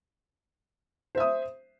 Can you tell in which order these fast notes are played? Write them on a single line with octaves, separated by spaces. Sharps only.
C5 E5 D#6